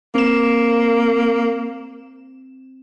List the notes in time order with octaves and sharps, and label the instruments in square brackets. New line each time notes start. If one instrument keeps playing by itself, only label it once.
[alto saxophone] A#3 [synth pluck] C4 E7